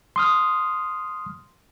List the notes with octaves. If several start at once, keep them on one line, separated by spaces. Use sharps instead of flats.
C6 D#6 F6